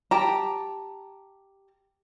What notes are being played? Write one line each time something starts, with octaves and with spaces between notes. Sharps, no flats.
G4 A5 A#5